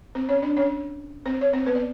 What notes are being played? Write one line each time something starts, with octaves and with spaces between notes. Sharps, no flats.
C4 C5
C#4 C#5
D4 D5
C#4 C#5
C4 C5
C#5
C4 C5
B3 B4
D5